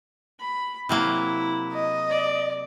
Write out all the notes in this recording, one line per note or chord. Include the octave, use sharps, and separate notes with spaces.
B5
C3 F#3 A#3 E4
D#5
D5